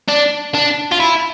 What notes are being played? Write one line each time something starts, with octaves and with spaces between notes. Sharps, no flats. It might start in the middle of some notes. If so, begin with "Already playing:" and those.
D4
D4
F4
E4